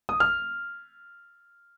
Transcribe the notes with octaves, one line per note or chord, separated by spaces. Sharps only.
D#6
F6